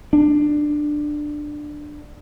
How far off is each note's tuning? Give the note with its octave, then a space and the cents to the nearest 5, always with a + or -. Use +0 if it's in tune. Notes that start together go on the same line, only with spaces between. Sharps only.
D4 +15